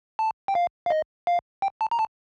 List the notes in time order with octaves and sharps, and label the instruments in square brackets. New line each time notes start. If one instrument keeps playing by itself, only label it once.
[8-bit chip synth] A5
G5
F5
F5
D#5
F5
G5
A5
A#5
A5